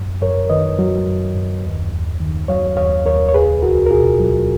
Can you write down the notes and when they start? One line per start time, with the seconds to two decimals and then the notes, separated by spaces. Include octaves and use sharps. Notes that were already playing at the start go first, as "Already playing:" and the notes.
Already playing: F#2
0.22 F#2 A#4 C#5
0.50 D#3 B4 D#5
0.79 F#3
1.08 F#2
1.35 F#2
1.64 D#2
1.92 D#2
2.20 D#3
2.48 F#3 C#5 F5
2.77 D#2 C#5 F5
3.06 D#2 A#4 C#5
3.28 C#5
3.34 C#2 G#4 B4
3.62 C#2 F#4 A#4
3.86 A#4
3.91 B2 F4 G#4
4.20 F#3